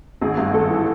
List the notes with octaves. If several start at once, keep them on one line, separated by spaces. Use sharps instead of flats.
G#1 G#4
G2
G2 A4
E3